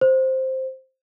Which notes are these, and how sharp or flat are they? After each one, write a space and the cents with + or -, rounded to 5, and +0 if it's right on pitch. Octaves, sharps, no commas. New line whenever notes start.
C5 +5